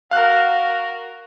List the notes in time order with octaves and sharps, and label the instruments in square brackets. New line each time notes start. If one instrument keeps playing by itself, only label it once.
[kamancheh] F#4 A#4 [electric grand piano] F5 F#6